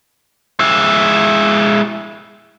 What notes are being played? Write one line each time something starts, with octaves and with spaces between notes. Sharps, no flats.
G#3 E4